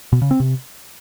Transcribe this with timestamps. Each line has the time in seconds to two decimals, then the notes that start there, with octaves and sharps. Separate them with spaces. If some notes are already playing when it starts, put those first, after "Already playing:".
0.12 B2
0.22 C#3
0.31 C4
0.40 C3